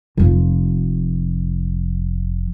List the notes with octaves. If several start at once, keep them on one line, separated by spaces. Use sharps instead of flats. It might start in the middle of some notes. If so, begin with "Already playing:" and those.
F1 F3